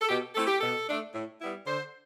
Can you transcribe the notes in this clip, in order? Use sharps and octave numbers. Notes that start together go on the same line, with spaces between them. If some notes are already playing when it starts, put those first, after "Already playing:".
A4
B2 G4
A3 C4 E4 A4
G4
B2 A4
A3 D4
A2
G3 B3 E4
D3 C5